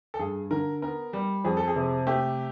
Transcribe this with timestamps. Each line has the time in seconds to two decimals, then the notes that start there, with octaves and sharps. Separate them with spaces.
0.14 A4
0.19 G2 G#4
0.51 D3 A#4
0.82 B3 A#4
1.13 G3
1.45 F2 G#4
1.57 A4
1.68 G#4
1.76 C3
2.07 A3 G4